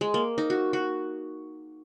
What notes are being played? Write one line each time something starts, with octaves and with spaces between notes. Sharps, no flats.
G#3
A#3
D#4
F#4
F#4